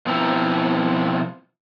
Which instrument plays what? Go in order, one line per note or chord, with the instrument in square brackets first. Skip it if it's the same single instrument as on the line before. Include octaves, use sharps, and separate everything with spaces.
[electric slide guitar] B2 F3 C4 E4 A#5